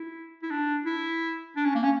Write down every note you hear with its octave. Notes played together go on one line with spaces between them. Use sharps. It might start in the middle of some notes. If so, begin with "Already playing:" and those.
Already playing: E4
E4
D4
E4
D4
C#4
A#3
C#4